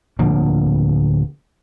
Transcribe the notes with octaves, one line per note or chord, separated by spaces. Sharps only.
D1 D3 F3 A#3